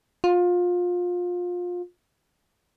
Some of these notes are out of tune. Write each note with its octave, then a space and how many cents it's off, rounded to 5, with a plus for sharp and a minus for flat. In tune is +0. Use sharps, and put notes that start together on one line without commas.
F4 +25